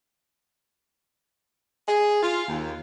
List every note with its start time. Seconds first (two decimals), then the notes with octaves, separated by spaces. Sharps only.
1.88 G#4
2.23 F4
2.48 D#2